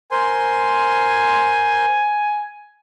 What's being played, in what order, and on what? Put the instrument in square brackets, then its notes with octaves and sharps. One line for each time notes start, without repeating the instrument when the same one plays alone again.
[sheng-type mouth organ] A#4 C5 C6 [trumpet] G#5